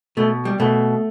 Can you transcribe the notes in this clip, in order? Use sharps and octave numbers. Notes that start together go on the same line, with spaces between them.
B2 A3
G3
B2 A3